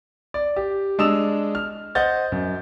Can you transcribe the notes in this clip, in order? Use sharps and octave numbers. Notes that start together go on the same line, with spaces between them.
D5
G4
G#3 D4 D#6 E6 E7 F7
F6
C5 D#5 F#5 G6 A6
F#2